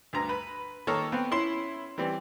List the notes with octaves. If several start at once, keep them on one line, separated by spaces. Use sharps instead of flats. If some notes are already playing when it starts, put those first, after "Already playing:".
D2 G2 A#5
B4
D#3 A#3 A4 C#5 A#5 F6
B3 C4
C#4 E4 C6
E3 G3 C4